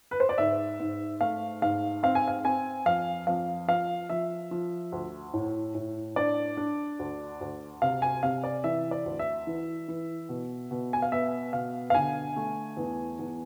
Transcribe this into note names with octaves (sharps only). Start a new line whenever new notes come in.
B4
C5
D5
G#2 E5
G#2
A3 F5
G#2 F5
C4 F5
G#5
F5
C4 G#5
F2 F5
F2 F5
F3 F5
F3 E5
F3
D2
A2
A2
D4 D5
D4
D2
D2
C3 F5
G#5
C3 F5
D5
E3 E5
D5
D2
E5
E3
E3
B2
B2
G#5
F5
B3 E5
B2 F5
F5
D3 G#5
A3
E2
E2